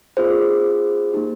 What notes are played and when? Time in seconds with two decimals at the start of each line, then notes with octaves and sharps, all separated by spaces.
0.17 C4 F4 G#4 C5
1.12 A#3 D#4 G4